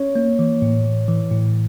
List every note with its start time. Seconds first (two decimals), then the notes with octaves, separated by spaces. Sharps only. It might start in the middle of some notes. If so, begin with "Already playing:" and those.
Already playing: C#4 C#5
0.15 A#3
0.39 E3
0.62 A2
0.85 E3
1.08 E3
1.31 A2